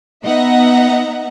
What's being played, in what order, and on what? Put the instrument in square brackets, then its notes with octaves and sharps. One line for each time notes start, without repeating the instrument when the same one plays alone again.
[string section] B3 D#4 D#5 E5 F#5 A#5